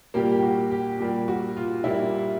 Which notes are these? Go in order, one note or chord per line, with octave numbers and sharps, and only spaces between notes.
A#2 G3 A#3 G4
G4
F#4
G4
A#2 G3 A#3 G4
F#4
F4
A#2 G3 A#3 E4